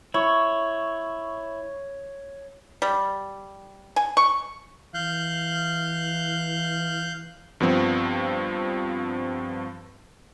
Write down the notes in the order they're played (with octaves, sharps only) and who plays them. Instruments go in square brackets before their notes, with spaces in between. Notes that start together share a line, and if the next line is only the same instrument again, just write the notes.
[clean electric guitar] E4 [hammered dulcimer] C#5
[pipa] G3
G#5
C#6
[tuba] E3 [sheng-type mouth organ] F5 F#6 G6
[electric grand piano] G2 F3 B3 C4